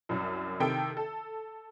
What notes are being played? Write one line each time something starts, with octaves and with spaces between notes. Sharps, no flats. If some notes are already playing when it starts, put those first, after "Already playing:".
C2 F#2
C3 D#3 A4 G5
A4